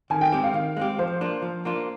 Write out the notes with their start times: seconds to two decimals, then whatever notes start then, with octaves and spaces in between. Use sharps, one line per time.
0.10 D#3 G#5
0.21 G5
0.32 G#3 C4 G4
0.44 F5
0.54 D#3
0.77 G#3 C4 G4
0.99 F3 C5
1.21 A#3 D4 F4
1.42 F3
1.65 A#3 D4 F4